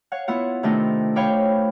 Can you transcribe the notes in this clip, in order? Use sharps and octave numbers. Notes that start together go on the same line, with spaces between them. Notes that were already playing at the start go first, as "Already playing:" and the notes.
C#5 F5 F#5
B3 E4 F4 F#5
C3 D#3 A3 D4 D#4 F4
C5 C#5 F5 G5 B5 D6